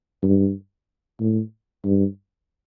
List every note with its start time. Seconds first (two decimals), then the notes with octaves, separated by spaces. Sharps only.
0.23 G2
1.20 A2
1.85 G2